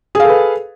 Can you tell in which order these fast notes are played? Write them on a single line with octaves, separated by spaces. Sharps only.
G#4 F5 A4 B4